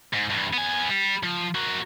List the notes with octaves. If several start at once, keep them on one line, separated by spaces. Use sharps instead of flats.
G#2
G2 E3
B3 G#5
G3
F3
A#3 F#4